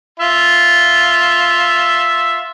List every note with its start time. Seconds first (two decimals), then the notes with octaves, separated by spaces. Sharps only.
0.20 F4 E5